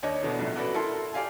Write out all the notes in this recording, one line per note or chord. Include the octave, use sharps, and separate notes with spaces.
D#2 D4 C#5 D#5
E2 B2 D3
A#1 F#2 A2
E4 F#4 A4 B4 D5
E4 A4 A#4 A5 C6
G4 D5 F5 G#5